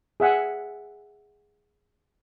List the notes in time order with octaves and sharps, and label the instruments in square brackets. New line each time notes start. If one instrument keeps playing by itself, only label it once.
[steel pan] G#4 E5 F#5 G#5